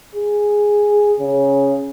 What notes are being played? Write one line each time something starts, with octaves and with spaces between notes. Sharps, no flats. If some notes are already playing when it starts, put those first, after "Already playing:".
G#4
C#3